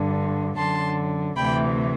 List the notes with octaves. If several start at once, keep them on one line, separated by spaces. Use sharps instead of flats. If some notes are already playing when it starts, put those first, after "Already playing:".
Already playing: G2 D3
F#2 D3 A5 C6
D2 C3 E3 G5 B5